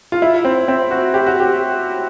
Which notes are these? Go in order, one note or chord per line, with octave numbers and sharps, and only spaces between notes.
F4
E4
C4
C4
F#4
G4
F#4
G4